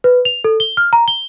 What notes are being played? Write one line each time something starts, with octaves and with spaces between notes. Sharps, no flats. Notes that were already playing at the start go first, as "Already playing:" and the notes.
B4
F7
A4
G7
F6
A#5
G7